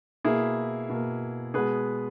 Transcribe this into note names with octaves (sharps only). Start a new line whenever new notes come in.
B2 A#3 E4 G#4
B2 A#3
B2 G#3 B3 G#4 B4